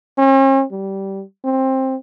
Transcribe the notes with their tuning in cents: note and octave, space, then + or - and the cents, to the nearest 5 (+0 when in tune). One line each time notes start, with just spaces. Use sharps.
C#4 -45
G3 -15
C4 +15